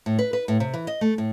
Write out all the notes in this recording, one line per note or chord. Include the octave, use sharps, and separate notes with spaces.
A2
B4
B4
A2
C3
E3
D#5
A3
A2